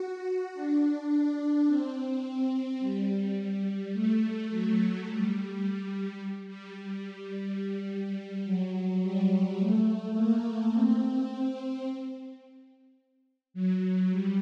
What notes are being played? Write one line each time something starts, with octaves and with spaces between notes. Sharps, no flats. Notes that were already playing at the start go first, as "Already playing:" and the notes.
Already playing: F#4
D4
D4
C4
G3
G3
A3
F#3
G3
G3
G3
F#3
G3
A3
A#3
C4
F#3
G3